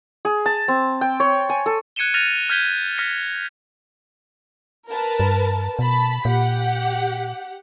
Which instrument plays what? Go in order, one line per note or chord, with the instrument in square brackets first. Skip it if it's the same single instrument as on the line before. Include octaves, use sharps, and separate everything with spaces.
[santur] G#4
A5
C4
G5
C#5
G#5
A4
[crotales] F#6 G#6 C#7 D#7 E7 G7
F6 F#6 A6 A#6 D#7 F7
F6 G6 G#6 B6 D#7 G7
F6 A#6 B6 C#7
[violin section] A#4 B4 A5
[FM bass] G2
[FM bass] B2 [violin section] A5 B5
[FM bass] A#2 [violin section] G4 F#5